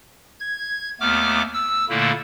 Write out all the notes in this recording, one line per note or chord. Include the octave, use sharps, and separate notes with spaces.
G#6
D#2 A3 B3 D6 F6
E6
A#2 D3 A3 A#3 E4